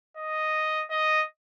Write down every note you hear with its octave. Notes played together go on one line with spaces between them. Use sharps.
D#5
D#5